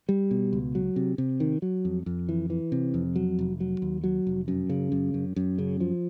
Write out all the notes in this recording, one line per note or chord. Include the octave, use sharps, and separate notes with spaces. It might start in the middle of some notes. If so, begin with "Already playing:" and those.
G3
B2
C#2
F#3
C3
C3
D#3
F#3
F2
F2
E3
E3
C3
F2
F#3
F1
F#3
D#2
F#3
F1
F#2
C#3
F#2
F#2
F#2
C#3
F3